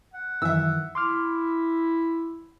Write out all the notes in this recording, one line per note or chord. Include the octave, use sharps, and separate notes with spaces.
F#5
F#2 D#3 E3 E5 E6
E4 C6 D6 F6